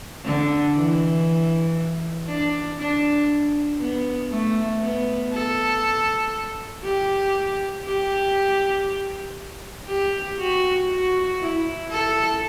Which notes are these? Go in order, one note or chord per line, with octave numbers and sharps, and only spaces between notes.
D3
E3
D4
D4
B3
A3
B3
A4
G4
G4
G4
F#4
F#4
E4
A4